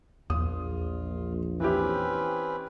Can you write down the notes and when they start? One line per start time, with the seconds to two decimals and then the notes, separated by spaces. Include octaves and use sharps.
0.30 A#1 E2 F4 D#6
1.60 E3 C4 C#4 E4 G4 B4